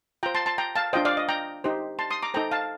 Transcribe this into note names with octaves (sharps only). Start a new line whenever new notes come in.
F4 C5 G5 A#5
A5 C6
A5 C6
G5 A#5
F5 A5
D4 F4 C5 D#5 G5
D5 F5
D#5
G5 A#5
D#4 G4 C5
A5 C6
C6 D#6
A#5 D6
D#4 A4 C5 G5 A#5
F5 A5